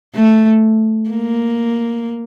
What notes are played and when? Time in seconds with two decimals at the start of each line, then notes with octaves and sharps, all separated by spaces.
0.15 A3
1.10 A#3